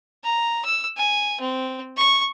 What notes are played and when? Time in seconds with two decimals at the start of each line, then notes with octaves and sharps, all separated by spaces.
0.24 A#5
0.65 E6
0.97 G#5
1.40 C4
1.97 C#6